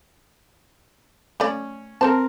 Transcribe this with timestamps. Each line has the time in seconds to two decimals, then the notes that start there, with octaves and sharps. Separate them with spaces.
1.40 A3 C#4 D5
2.01 C4 A4 A#4 C5 A5